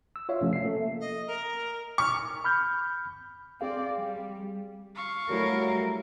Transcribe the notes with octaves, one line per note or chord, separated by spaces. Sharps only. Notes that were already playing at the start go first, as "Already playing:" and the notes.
E6
F4 C#5 E5 F5
C3 F3 A3 C#4
E5 C7
A#3 A4
D#5
A#4
C#6 F6
B5 F6 G6
C4 G#4 D5 F5
G3
F5 C#6
F#3 G3 A3 E4 A#4